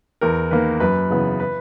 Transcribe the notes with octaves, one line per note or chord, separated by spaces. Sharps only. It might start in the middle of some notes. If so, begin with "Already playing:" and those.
E2 A#4
D#3 A#3 B4
F#2 B4
C#3 E3 B3
B4